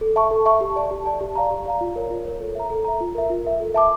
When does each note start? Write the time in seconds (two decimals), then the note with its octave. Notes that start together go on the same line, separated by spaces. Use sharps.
0.01 A4
0.16 E5 A5 C#6
0.31 A4
0.46 E5 A5 C#6
0.61 G4
0.76 D5 A5
0.91 G4
1.06 D5 A5
1.21 G4
1.35 D5 F5 A#5
1.51 G4
1.66 D5 F5 A#5
1.81 F4
1.96 A#4 C#5
2.10 F4
2.25 A#4 C#5
2.40 A4
2.55 E5 A#5
2.70 A4
2.84 E5 A#5
3.01 F4
3.15 A#4 E5
3.30 F4
3.45 A#4 E5
3.60 A4
3.74 E5 A5 D6